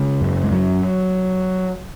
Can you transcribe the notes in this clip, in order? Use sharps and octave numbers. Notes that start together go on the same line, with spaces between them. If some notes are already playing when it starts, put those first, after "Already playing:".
Already playing: C#3 G#3
F#2
G#3
F#2 F#3